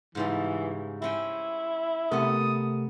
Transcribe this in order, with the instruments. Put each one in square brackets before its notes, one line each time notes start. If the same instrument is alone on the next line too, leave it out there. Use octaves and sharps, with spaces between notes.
[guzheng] G#2 C#3 G3 [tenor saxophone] E3
[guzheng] C4 C#4 G5 [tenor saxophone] E4
[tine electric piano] C3 A3 A#4 [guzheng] B3 A4 [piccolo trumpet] D#6